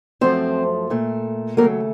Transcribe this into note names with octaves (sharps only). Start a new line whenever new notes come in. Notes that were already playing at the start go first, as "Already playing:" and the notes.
F#2 F3 A3 C4 C5
A#2 A3
D#2 C#3 F#3 A3 A#3 A#4